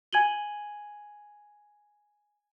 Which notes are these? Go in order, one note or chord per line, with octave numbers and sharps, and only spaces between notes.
G#5 G#6 D#7 F#7 G7